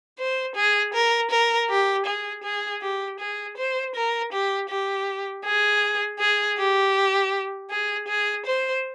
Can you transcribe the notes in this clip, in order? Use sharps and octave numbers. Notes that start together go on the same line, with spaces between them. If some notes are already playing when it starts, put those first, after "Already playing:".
C5
G#4
A#4
A#4
G4
G#4
G#4
G4
G#4
C5
A#4
G4
G4
G#4
G#4
G4
G#4
G#4
C5